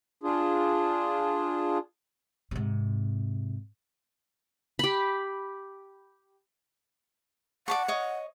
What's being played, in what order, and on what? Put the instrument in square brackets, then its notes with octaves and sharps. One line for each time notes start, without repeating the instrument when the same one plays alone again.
[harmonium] D4 F4 G#4
[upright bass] G#2 C3
[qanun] G4 B5
[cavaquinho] D5 A5 C#6 [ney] F#5
[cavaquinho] C#5 D#5